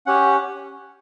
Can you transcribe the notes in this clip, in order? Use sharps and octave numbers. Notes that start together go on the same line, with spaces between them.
C#4 G4 F#5